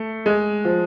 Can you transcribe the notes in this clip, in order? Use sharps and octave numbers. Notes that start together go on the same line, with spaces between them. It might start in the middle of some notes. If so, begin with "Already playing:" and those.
Already playing: A3
G#3
F3